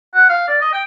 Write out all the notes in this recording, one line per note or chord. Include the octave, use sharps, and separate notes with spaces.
F#5
F5
D5
D#5
G5